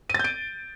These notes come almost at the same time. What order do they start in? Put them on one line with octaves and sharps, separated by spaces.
D#7 A6 G6 D7